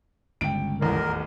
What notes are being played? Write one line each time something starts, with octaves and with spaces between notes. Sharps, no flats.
G1 C#2 G5 D7
D#1 A1 E2 A#4